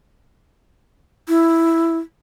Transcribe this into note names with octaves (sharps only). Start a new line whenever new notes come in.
E4